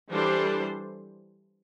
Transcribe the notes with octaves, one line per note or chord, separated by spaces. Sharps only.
E3 G3 D4 A4 C5